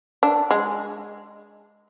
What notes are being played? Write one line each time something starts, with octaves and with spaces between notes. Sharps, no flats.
D4
G#3